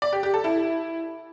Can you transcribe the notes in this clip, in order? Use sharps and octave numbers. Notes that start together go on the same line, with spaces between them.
D5
G4
G4
A4
E4